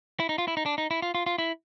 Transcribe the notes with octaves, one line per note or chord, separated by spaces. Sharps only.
E4
D#4
F4
E4
D#4
D4
D#4
E4
F4
F4
F4
E4